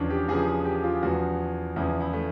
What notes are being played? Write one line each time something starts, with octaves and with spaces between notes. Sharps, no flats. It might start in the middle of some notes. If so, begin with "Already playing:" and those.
Already playing: E2 C#3 F3 C#4 D4
G4
E2 C#3 F3 G#4
G#4
G4
F4
E2 C#3 F3 F#4
E2 C#3 F3 E4
E4
A3